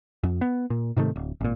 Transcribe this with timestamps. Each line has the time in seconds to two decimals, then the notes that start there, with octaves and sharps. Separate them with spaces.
0.23 F2
0.41 B3
0.70 A#2
0.97 G#2 C3 D#3 A3
1.16 D1
1.41 G#1 A#2